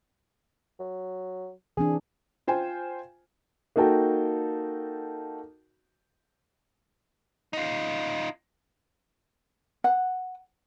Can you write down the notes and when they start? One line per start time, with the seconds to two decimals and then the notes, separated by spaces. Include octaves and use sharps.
0.80 F#3
1.77 E3 C4 D4 G#4
2.47 F4 C5 G5 G#5
3.76 A#3 D#4 F#4 A4 G5
7.53 D#4 F4
9.84 F#5